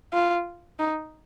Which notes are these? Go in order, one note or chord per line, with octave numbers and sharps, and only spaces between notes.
F4
D#4